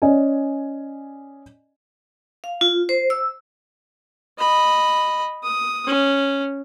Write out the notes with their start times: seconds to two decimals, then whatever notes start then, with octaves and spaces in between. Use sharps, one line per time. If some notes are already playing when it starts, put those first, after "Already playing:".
0.02 C#4 D5 D#5 G#5
2.44 F5
2.61 F4
2.89 C5
3.10 E6
4.39 D#5 B5
5.43 D#6
5.87 C#4